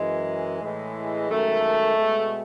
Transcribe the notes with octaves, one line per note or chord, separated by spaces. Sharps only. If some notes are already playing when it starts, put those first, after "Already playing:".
Already playing: F#2 E3 G#3
A2 E3 G#3
F#2 D#3 G#3 A3
B2 G#3